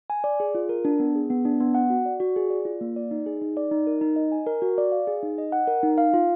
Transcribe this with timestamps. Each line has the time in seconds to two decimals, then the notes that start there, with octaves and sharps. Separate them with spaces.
0.10 G#5
0.24 D5
0.40 G#4
0.55 F4
0.69 A#4
0.85 D4
1.00 B3
1.15 G#4
1.30 B3
1.45 D4
1.60 B3
1.75 F#5
1.90 F#4
2.06 D5
2.20 F#4
2.36 G#4
2.50 D5
2.65 F4
2.81 A#3
2.96 D5
3.11 D#4
3.26 G#4
3.42 D#4
3.57 D5
3.71 D#4
3.87 A#4
4.01 D#4
4.16 D#5
4.32 G#5
4.46 A#4
4.62 F#4
4.78 D5
4.92 F5
5.07 G#4
5.23 D#4
5.38 D#5
5.52 F#5
5.67 A#4
5.83 D#4
5.98 F5
6.13 F4